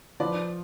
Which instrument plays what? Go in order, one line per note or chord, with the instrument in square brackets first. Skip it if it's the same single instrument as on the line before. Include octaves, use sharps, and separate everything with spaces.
[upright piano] F3 [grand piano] B4 D5